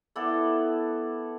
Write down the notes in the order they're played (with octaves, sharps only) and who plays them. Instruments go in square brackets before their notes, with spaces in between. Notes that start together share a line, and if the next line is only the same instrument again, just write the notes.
[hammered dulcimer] B3 E4 A4 D5